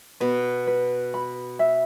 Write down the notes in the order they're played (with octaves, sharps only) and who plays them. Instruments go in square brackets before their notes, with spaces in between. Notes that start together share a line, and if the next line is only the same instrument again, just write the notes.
[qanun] B2 [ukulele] B4
[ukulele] B4
B5
E5